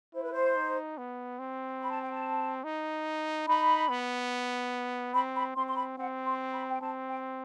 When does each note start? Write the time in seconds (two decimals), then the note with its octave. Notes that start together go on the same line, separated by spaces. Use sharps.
0.14 E4 C5
0.23 B4
0.32 C5
0.56 D#4
0.98 B3
1.39 C4
1.81 B5
1.91 A5
2.01 G5
2.12 A5
2.64 D#4
3.48 D#4 B5
3.89 B3
5.14 C4 B5
5.36 B5
5.56 C4 C6
5.68 C6
5.76 B5
5.97 C4 F#5
6.26 C6
6.53 B5
6.70 G5
6.81 C4 A5
7.09 G5